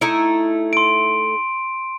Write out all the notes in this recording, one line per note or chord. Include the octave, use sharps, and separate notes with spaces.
A3 D#4 E4
C6 D7